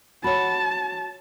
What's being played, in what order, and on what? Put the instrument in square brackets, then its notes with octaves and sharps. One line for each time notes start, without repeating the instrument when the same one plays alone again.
[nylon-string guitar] F#4 C#5 [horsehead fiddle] A5 [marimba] B5